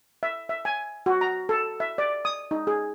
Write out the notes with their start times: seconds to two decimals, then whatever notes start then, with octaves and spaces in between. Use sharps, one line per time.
0.23 E5
0.49 E5
0.65 G#5
1.06 F#4
1.21 A#5
1.49 A4
1.80 E5
1.98 D5
2.25 D#6
2.51 D#4
2.67 G#4